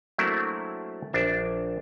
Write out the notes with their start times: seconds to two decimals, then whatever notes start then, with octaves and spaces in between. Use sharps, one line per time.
0.18 F#3 A3 A#3 C4 D4 E4
1.13 A#1 D4 E5